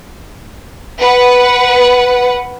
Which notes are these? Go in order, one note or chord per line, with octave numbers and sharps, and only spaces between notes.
B4 F#5